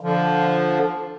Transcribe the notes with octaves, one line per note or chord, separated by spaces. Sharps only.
D3 F3